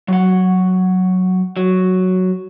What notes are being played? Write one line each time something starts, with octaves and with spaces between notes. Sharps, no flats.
F#3 F#5
F#3